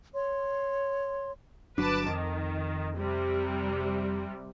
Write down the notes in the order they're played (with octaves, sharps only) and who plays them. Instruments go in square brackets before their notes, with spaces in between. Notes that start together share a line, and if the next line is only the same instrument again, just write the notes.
[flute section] C#5 C6
[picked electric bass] G1 F#3 D4 [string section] B4 A5 D6
[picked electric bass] F2 [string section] D#3
[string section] C3 G3